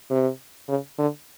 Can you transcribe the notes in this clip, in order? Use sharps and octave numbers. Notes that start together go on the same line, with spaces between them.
C3
C#3
D3